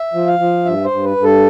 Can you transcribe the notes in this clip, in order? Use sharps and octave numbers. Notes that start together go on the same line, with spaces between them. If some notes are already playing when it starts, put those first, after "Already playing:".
Already playing: E5
F3
F5
F3
G2 E5
C5
G2
B4
G2
A4